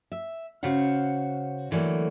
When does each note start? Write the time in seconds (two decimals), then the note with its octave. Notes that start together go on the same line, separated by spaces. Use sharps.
0.12 E5
0.63 C#3 F#4 C5 F5 F#5
1.71 D3 E3 F#3 A3 A#3